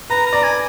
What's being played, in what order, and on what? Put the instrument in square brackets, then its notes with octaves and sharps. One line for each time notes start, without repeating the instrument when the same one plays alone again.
[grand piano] B4 [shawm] A#5
[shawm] A#5
[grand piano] D5
[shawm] G#5